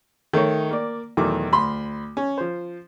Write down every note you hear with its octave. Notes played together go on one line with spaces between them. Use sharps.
D#3 A3 D#4 C#5
A#3 D5
E2 B2 D#3 F#3 A3 D6
D2 B5 C6
C#4
F3 C5